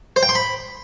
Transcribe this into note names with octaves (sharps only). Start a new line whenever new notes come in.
C5
G5
C6
B5